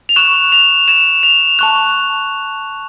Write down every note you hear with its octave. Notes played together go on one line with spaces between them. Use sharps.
F7
C#6 F#6 E7
F7
E7
F7
A5 C#6 F#6